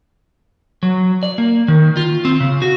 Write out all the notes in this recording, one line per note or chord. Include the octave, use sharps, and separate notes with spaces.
F#3
D5
A#3
D#3
F4
C4
C#3
F#4